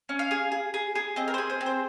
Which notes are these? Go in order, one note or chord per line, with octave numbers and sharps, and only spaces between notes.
C#4
F5
G#4
G#4
G#4
G#4
C4 D#5
A#4
C5
G#4
C5
C4
C5